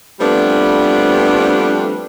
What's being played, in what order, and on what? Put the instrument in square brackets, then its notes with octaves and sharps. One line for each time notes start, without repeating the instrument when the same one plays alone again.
[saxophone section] F3 G3 A3 B3 C4 D4